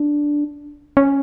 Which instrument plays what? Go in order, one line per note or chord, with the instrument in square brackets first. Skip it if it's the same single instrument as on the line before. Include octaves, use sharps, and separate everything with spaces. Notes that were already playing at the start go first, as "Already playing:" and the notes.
Already playing: [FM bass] D4
C#4